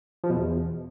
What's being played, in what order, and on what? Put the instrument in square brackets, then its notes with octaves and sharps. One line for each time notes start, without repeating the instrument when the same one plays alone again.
[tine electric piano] F3
B2
E2